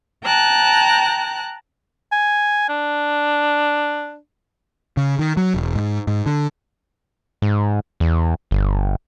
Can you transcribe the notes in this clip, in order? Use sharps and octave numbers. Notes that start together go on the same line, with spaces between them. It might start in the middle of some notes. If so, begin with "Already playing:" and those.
G5 A5 A#5 F#6
G#5
D4
C#3
D#3
F#3
E1
G#2
G#2
D3
G#2
E2
G1